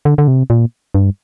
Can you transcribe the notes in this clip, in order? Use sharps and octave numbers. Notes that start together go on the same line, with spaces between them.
D3
D3
C3
A#2
G2